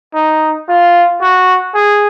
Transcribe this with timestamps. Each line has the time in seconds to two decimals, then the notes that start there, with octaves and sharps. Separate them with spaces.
0.14 D#4
0.69 F4
1.21 F#4
1.74 G#4